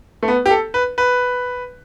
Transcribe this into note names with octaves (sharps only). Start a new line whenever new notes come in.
A3
B3
G4
A4
B4
B4